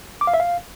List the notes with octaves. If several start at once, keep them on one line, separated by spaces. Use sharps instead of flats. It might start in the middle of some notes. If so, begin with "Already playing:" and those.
D6
F5
E5
F5